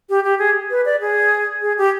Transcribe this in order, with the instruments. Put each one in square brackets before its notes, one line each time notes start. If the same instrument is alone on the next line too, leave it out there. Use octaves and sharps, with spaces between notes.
[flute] G4
G4
G#4
B4
D5
G#4
G#4
G4